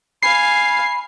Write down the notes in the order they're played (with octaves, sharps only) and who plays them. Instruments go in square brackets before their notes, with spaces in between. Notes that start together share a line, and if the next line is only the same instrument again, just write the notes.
[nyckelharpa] F5 G#5 [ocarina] B5 [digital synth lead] C7